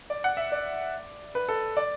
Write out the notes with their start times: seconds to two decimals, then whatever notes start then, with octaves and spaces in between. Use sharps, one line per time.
0.10 D5
0.24 F#5
0.37 E5
0.52 D5
1.35 B4
1.49 A4
1.77 D5